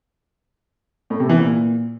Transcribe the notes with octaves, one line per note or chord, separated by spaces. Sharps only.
A2
C3
E3
A#2